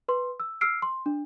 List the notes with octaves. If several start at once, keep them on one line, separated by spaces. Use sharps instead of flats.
B4 C6
E6
E6 F6 C7 D7
C6
D4